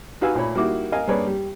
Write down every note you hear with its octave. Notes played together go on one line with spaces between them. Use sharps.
D#4 F#4 B4 F5 G#5 E6
A#2 A3 C#5 B5
G3 A#3 D#4 E4 F#4 D6
A#4 D#5 F5 G#5
G2 A#3 G#4 B4 C#5 D5
G3